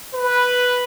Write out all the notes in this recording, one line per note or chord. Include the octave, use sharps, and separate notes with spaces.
B4